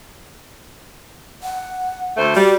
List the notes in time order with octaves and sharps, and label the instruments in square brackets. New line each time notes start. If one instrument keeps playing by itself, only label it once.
[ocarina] F#5
[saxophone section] D2 A3 C5
[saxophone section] G3 [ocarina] F#4